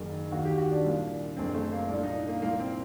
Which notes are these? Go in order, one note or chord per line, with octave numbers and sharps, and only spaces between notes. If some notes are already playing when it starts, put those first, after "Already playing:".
Already playing: F#1 F#2 D#3
D#2 D#3 F#4
G4
F#4
D4
C2 A#2
F#1 F#2 D3 C4
A3
A#3
C2 A#2 D4
D#4
A#3
C2 A#2 A#3
C4